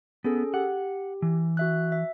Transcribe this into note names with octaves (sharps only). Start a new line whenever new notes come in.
B3 C#4 G#4 A4
G4 F#5
E3
F#4 E5 F#6
E5